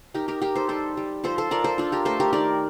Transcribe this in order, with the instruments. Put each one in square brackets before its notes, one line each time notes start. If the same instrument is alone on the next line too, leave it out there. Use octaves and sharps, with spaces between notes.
[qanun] D#4 G4 A#4
G4 A#4
D#4 G4 A#4
A4 C5
G3 A4 C5
G3
F3 A4 C5
A4 C5
F3 A#4 D5
A4 C5
D4 F4 A4
G4 A#4
A3 A4 C5
G4 A#4
D#3 A#4 D5